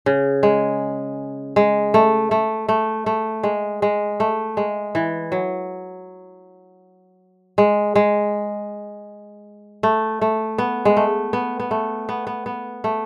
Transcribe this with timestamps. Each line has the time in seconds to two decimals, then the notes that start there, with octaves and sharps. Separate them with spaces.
0.06 C#3
0.43 G#3
1.56 G#3
1.94 A3
2.31 A3
2.69 A3
3.06 A3
3.43 G#3
3.82 G#3
4.20 A3
4.57 G#3
4.95 E3
5.32 F#3
7.58 G#3
7.95 G#3
9.83 A3
10.21 A3
10.58 B3
10.85 G#3
10.97 A3
11.33 B3
11.60 B3
11.71 A3
12.09 B3
12.27 B3
12.46 B3
12.84 A3